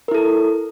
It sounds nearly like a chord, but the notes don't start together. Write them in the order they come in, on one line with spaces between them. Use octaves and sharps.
A#4 E4 A4